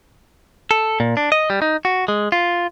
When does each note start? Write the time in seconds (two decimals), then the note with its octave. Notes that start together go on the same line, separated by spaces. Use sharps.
0.71 A4
1.00 A#2
1.17 D4
1.32 D#5
1.50 G3
1.62 D#4
1.85 F#4
2.08 G#3
2.32 F4